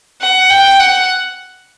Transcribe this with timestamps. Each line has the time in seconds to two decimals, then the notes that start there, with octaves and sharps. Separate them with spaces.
0.22 F#5
0.50 G5
0.79 F#5